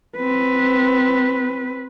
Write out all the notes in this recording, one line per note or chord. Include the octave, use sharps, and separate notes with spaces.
C4 B4